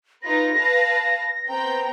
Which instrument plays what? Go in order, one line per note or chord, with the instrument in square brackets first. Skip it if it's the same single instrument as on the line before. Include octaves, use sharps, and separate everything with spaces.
[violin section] D#4 F4 B4 [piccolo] A#6
[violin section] B4 F5 A5
[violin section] B3 C4 G5 [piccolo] A#5